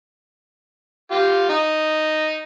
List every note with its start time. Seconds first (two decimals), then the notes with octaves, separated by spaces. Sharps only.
1.11 F4 G4
1.50 D#4